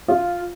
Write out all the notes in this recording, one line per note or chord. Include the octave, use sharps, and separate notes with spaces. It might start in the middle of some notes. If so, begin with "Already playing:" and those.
F4